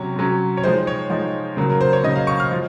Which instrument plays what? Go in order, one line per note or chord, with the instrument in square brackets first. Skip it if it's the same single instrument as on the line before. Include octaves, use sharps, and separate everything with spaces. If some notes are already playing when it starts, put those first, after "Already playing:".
Already playing: [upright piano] C3 F#3 C#4 C#5
C3 F#3 C#4
C#5
F3 G#3 D#4 C5
C#5
F3 G#3 D#4
C#3 F#3 A#3
A#4
C5
C#5
C#3 F#3 A#3 D#5
F5
C#6
F6
F3